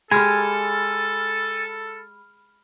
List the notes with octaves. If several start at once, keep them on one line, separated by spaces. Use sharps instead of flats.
G#3 G4 A4 G#5 B5 F6